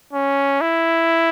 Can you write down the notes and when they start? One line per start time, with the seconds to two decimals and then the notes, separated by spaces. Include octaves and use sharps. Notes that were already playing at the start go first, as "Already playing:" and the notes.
0.13 C#4
0.61 E4